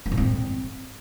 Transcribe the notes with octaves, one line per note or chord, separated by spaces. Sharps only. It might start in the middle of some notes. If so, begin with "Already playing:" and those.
A#3
A2
C4